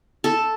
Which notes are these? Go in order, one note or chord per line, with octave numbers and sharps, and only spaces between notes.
A4